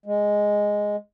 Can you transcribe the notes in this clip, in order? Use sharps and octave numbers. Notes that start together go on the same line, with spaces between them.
G#3